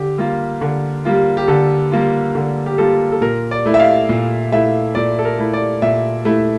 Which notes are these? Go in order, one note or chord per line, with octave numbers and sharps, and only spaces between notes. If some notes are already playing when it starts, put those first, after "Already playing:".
Already playing: D3 G4
G3 A#3 F4
D3
G3 A#3 F4
G4
D3 A4
G3 A#3 F4
D3
G4
G3 A#3 F4 A4
A4
A#2 A#4
D5
A3 E4
E5
F5
A#2
A3 E4 E5
A#2 D5
A4
A#4
A3 E4
D5
A#2 E5
A3 E4